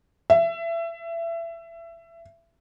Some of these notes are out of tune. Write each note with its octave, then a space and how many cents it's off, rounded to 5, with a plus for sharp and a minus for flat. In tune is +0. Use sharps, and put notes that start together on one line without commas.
E5 +25